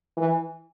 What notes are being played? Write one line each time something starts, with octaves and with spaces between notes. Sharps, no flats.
E3